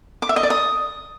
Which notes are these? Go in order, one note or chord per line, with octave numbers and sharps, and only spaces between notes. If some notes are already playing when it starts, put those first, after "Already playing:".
D6
E5
D#5
D5
D#6